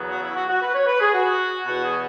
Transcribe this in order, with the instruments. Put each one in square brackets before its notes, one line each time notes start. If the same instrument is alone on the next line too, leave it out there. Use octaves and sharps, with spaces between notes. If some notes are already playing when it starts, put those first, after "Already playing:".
Already playing: [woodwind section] E2 C#3 F#3 B3
F#4
E4
F#4
F#4
B4
C#5
B4
G#4
F#4
E2 B2 B3 F#4
G#4